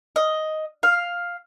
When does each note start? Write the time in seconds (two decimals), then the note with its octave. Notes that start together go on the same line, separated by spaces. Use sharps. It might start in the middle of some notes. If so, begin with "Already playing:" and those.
0.16 D#5
0.83 F5